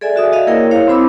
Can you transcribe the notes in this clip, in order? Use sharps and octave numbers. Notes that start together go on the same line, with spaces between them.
G#4 A4 D5 E5 G#5
F#4 E5 D#6
F#4 D5 D#5 F5
A#3 E4 G#4 A#4 C#5 G5
E4 C5 C#5 F5
C4 E4 C5 B5 D6 E6